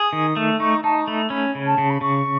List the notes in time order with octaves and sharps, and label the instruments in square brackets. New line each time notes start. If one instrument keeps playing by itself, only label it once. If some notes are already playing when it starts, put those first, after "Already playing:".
Already playing: [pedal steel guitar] G#4 [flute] D#6
[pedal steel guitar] D#3
A3
[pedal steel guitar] D#4 [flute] C#6
[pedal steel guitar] D#4 [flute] A5
[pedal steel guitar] A3 [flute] B5
[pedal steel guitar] C#4 [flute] B5
[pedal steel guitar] C#3
[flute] A5
[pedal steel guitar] C#3
[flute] B5
[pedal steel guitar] C#3 [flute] C#6